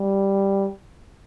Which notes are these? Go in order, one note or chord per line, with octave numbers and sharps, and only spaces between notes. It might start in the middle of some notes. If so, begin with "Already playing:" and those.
Already playing: G3